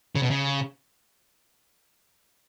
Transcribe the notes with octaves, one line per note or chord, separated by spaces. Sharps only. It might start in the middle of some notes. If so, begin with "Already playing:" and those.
C#3
B2
C#3